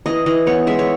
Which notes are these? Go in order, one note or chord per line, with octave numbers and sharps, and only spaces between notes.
E3 D#5
E3 D#5
B3 C#5
G#3 E5
C#5